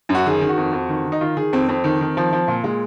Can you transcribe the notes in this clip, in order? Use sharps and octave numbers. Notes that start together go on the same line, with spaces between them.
F#2
F#4
D#3 G#4
D#3
F#4
F2
F2
D#3
D#3
D#4
D#3 F4
D#3 G#4
F2 C4
F2 C4
D#3
D#3
F3
F3
A#2
A#2 G#3